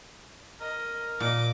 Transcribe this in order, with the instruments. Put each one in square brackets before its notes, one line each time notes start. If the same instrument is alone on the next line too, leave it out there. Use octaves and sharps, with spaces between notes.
[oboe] A#4 [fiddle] D#5
[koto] A#2 [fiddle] D#5 D6